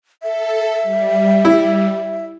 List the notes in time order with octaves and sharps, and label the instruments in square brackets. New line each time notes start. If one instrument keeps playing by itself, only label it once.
[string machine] A4 [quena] E5
[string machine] G3
[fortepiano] E4